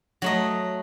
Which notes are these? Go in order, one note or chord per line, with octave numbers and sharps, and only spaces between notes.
F#3 A3 D#5